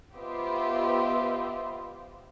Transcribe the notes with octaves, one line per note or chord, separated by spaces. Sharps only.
B3 F4 G4 C5 D#5 E5